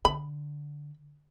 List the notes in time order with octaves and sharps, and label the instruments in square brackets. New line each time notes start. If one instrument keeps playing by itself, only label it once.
[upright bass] D3 [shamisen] B5